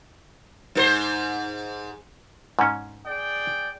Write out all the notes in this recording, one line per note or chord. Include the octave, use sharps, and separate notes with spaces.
G#2 A4 C5
G#2 C#4
G#4 D5 G5